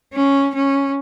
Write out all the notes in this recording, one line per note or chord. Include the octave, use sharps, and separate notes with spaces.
C#4
C#4